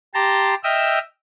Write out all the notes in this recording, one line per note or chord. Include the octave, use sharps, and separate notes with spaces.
G4 A5 A#5 C6
D#5 E5 G5 E6 F6